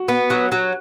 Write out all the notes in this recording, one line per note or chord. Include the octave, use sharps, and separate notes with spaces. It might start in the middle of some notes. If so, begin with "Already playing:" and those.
Already playing: F#4
B3
F#3
F#3